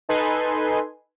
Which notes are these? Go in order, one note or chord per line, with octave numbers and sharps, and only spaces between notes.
D#4 A4 B4 G#5 C6